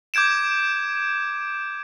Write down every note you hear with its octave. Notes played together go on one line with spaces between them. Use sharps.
D6 G6 G#6 D7 E7